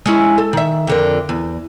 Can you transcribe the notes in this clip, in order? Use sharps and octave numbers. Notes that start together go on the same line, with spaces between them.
G#3 C#4 E4
A4
D#3 E5
F2 D3 A#4
E2